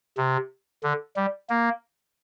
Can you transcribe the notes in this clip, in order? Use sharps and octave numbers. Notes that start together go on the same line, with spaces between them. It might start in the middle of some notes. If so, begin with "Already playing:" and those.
C3
D3
G3
A#3